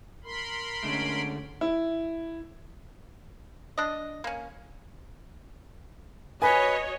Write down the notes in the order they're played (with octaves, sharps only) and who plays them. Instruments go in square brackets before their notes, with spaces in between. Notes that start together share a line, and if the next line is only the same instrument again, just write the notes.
[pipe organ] A#4 B5 C6
[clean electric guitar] D3 G#3 A3 [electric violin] C#4 D7
[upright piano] E4
[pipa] D4 D#5
A#3 C#4
[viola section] F#4 C#5 D#5 [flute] B4 [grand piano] G#5